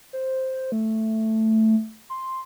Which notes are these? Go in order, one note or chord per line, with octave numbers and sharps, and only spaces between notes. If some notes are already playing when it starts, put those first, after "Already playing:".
C5
A3
C6